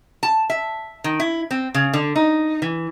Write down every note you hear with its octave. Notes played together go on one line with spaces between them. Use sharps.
A5
E5
D#3
E4
C4
C#3
D3
D#4
E3